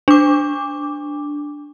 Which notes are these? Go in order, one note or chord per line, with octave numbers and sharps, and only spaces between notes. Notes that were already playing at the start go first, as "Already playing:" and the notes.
D4 D6